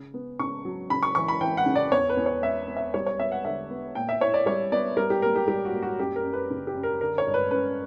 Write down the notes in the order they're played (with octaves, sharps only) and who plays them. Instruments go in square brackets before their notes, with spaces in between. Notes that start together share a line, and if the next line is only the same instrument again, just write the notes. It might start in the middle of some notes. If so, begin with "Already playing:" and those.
Already playing: [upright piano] C#3 C#4
B3
C#3 C#6
F#3
C#3 B5
C#6
E3 C#6
B5
E3 G5
F#5
C#3
D5
E2 C#5
B4
E2
C#5
B3 E5
B3
E5
G3 C#5
C#5
B3 E5
F#5
D3 E5
B3
A#2 G5
E5
E4 C#5
D5
G3 C#5
B3 D5
G3 A#4
G4
A#3 A#4
G4
G3 G4
F#4
A#3
F#4
F#2 G4
A#4
F#2
B4
C#3
G4
F#2
A#4
D3 A#4
C#5
G2
B4
C#4 B4